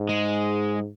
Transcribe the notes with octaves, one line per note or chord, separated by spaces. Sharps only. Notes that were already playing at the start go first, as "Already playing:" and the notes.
Already playing: G#2
G#3